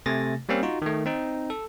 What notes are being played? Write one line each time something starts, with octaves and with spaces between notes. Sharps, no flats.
C3 A3 G#5 A6 A#6
G3 A#3 C4 C#4
D#4 F4 F#4
D#3 A3
C4 D#4
A4